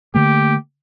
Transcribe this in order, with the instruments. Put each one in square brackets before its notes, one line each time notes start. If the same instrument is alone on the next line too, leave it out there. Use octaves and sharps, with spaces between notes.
[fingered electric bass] D3 A3 A#3 [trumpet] G4